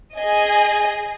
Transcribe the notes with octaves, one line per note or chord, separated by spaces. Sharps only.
G#4 D#5 G#5